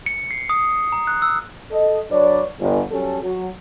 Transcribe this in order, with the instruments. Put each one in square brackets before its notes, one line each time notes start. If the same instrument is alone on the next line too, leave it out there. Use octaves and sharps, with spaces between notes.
[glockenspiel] C#7
C7
D#6
A#5
F#6
E6
[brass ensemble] A4 D#5
F#3 D4 B4 C#5 D5
G1
F#3 G3 C#4 A4
F#3